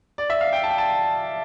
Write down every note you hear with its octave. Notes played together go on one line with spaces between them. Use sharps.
D5
E5
F5
G5
A5
G5
A5